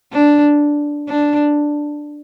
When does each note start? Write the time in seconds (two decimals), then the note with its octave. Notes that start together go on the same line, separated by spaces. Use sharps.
0.13 D4
1.08 D4